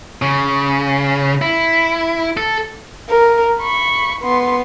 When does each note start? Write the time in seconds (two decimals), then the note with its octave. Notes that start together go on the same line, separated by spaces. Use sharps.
0.22 C#3
1.42 E4
2.37 A4
3.10 A#4
3.61 B5 C#6
4.21 B3 C6